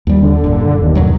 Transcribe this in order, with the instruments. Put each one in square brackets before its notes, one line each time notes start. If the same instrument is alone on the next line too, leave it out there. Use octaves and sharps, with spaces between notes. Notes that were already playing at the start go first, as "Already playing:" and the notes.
[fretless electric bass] D#2 G3
[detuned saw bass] D3
[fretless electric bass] F#1 A#2
[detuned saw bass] D#2
[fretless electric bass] G2 B2 F#3